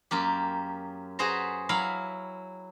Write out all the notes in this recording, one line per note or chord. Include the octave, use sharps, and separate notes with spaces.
F#2 A#3 G4
F#4 G#4 B4 C5 A#5
F#3 E4 F5 B5